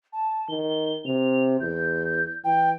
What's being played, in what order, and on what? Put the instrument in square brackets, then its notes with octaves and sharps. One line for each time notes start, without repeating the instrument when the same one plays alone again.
[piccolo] A5
[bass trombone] D#3 [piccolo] G7
[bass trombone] C3 [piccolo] F7
[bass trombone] E2 [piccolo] G6
[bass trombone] E3 [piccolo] G5